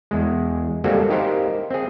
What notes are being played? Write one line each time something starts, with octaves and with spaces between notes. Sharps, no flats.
E2 G#3
G3 G#3 A#3 C4 F#4 A4
D#4 G4 A#4 C5 F5
C4 G#4